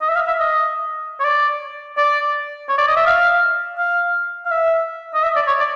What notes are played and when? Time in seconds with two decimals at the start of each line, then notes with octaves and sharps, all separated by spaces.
0.01 D#5
0.09 E5
0.16 F5
0.28 E5
0.40 D#5
1.20 C#5
1.24 D5
1.98 D5
2.69 C#5
2.78 D5
2.88 D#5
2.97 E5
3.06 F5
3.78 F5
4.45 F5
4.51 E5
5.14 D#5
5.23 E5
5.36 D5
5.47 C#5
5.59 D5